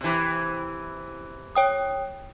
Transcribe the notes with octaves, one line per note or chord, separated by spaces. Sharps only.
C3 E3
C#5 G5 D#6